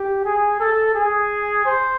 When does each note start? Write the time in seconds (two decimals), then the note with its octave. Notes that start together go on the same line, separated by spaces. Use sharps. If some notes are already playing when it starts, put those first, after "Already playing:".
Already playing: G4
0.25 G#4
0.60 A4
0.95 G#4
1.65 C5